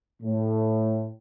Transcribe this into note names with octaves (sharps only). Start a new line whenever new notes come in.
A2